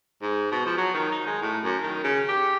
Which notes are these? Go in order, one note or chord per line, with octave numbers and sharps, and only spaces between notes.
G#2
B2
F3
F#3
D#3
D#4
G#3
A2
F#2
D#3
C#3
G4